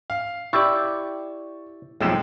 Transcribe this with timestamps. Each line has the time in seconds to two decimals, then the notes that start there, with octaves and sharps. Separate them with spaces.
0.10 F5
0.53 E4 G4 D5 C#6 E6 A6
2.01 B1 F2 A2 G#3 G5 E7